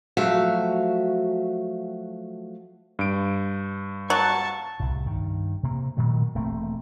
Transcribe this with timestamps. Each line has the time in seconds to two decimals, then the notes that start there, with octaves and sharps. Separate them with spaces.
0.17 F3 F#3 A3 F#4 E5 F5
2.99 G2 D7
4.10 F#3 A5 C#6
4.80 C2 A2
5.06 G2 D#3
5.63 C3 A#3
5.97 A#2 D#3 F#3 A3
6.35 E1 A3 A#3 C4